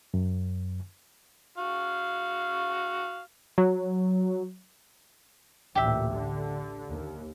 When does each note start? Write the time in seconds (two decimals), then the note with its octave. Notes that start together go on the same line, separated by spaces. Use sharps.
0.14 F#2
1.58 F#4 F5
3.58 F#3
5.75 A1 D2 A#2 G4 E5
6.10 D3
6.89 D#2